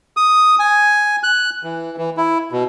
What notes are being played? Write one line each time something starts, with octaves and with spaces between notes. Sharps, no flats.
D#6
G#5
F#6
E3
E3
E4
B2